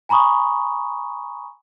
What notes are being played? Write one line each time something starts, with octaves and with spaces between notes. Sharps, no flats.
G#5 A#5 B5 C#6 D#6